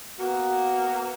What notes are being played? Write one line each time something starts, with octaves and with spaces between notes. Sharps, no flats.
A#3 B3 F#4